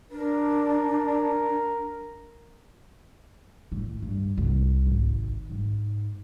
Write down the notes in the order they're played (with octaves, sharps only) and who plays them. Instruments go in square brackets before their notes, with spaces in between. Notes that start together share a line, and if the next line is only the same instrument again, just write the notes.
[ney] D4 [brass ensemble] A#4
[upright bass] A2
G2
C2
G#1
G#2